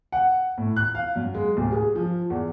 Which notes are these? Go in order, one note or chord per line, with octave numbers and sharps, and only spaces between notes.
F#5
A2
F#6
F5
F#2
G#3
D1
G#4
F3
E2